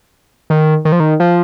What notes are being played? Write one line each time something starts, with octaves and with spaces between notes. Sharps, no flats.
D#3
D#3
F3
D#3
F3